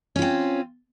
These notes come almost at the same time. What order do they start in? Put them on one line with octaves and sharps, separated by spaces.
C#4 F4 C4